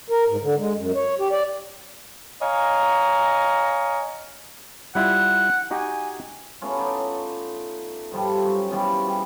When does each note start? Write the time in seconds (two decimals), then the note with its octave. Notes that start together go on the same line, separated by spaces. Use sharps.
0.10 A#4
0.28 G#2
0.42 D3
0.58 G#3
0.76 F#2
0.95 C#5
1.19 G4
1.32 D5
2.42 C#5 D#5 F5 G#5 A#5
4.95 G3 E4 F4 F#5
5.71 D#4 F#4 G4 G#5
6.61 A3 B3 C#4 F4
6.79 D#4 F4 D5
8.12 G2 F3 G3 A4
8.41 F#2 C#6
8.71 B2 E3 F3 G3
9.07 G3 G#4